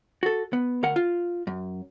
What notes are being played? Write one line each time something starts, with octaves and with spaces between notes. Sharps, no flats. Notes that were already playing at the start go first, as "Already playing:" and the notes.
F#4 A4
B3
D2 A#4 F#5
F4
F#2